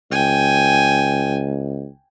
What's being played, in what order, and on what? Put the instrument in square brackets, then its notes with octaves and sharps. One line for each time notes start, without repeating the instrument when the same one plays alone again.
[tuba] C#2 [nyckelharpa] G5 G#5